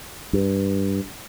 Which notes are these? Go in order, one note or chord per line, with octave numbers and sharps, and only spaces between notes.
G2